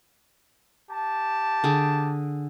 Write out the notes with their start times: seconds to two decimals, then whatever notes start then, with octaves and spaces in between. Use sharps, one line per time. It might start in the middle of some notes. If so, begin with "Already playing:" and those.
0.91 G4 A5
1.64 D3 G#4 D6